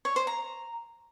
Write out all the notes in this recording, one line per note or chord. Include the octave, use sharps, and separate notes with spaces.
C#5
C5
A#5